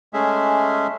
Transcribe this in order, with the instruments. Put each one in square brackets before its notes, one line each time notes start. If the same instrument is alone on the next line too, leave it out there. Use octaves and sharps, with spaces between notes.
[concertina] G#3 A3 C#4 G#4 E5